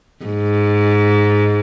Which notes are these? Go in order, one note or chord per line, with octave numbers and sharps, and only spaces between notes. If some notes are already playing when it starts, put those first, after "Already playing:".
G#2